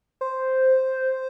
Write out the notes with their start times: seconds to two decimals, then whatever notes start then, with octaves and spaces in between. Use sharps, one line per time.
0.21 C5